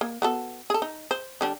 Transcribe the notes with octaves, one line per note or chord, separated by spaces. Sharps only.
A#3
B3 F#4 A4
G#4 A4
D#4
C5
D3 G3 D4